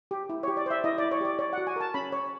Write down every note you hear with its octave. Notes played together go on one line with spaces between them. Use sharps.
G4
E4
C#5
G4
D5
C5 E5
E4 D#5
D5
E4
C#5
G4 D5
C#5 D5
F#5
F#4
G#5
A#4 A5
C#4 B5
C#5